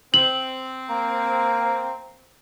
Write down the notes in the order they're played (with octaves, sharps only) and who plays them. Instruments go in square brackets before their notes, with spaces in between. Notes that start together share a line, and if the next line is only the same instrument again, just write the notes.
[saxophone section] C4 [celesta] F#7
[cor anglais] A#3